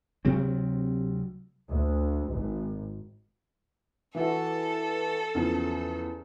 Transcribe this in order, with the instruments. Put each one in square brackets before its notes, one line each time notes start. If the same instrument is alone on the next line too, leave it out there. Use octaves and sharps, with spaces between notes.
[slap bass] D2 C3 F#3 C4
[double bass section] D2
G#1
[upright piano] E3 E4 F#4 [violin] A4
[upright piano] E2 C#3 F3